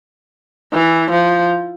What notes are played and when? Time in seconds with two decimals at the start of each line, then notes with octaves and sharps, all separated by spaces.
0.73 E3
1.10 F3